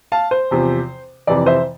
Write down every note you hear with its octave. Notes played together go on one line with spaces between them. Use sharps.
F5 A5
C5
E2 C3 F3
F2 C3 E3 D5
C5 E5